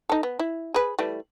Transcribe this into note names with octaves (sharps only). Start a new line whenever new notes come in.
D#4 A4
B3
E4
G#4 B4
E3 G3 A3